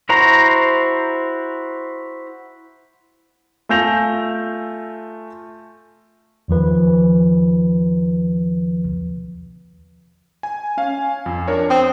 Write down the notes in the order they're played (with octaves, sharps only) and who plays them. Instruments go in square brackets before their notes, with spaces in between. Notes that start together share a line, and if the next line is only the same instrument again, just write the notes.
[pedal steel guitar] E4 F#4 C5 A#5
[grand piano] A3 F4 G#5 G6 A#6 F7
[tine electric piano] E2 D#3 F3 B4
[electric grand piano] G#5
C#4 F5 G#5
F2
D4 A#4 C#5
[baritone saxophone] C4 [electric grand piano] D#6